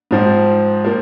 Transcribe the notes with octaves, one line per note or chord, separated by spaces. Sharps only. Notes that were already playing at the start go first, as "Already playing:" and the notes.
G#2 F3 C4
F3 A#3